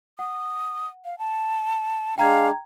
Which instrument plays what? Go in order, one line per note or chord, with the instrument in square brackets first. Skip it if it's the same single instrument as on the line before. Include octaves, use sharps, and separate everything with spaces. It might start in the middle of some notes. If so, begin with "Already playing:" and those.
[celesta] F#5 [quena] D#6
[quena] F5
A5
[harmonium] G#3 D4 [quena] F5 [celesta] G5 A#5 G#6